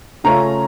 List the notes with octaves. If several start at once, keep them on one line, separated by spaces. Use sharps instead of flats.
C#3 A3 C#4 F4 A#5